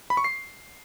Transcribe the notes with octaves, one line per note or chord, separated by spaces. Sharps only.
B5
C#6
C7